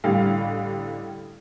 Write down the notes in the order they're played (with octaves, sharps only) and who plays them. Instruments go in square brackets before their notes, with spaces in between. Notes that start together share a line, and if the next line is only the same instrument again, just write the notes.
[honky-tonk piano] A1 D3 G3 F5